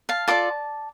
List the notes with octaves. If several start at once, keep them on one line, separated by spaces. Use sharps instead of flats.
F5 A5
F4 A4 D5 A5 D6